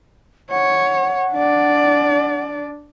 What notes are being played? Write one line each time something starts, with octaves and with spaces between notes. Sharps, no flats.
C#5 F#5
D4 D5